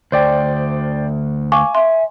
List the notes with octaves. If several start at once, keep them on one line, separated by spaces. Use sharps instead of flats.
D2 C5 D5 G5
F5 G#5 C#6 D6
E5 C6